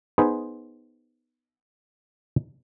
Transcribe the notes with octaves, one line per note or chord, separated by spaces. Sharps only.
B3 D#4 G#4 B4 C5